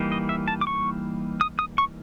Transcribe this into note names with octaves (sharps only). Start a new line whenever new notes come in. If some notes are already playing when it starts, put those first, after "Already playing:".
Already playing: E3 G3 A#3 D#4
D#5
E5
A5
D6
C#6
D#6
D#6
C#6